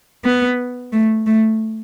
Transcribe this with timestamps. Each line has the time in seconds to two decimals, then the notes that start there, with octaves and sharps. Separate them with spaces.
0.24 B3
0.93 A3
1.27 A3